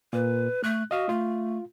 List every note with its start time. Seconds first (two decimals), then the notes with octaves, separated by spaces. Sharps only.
0.13 A#2 B4
0.64 A3 F#6
0.91 F#4 D#5 F5 D#6
1.09 A3 F4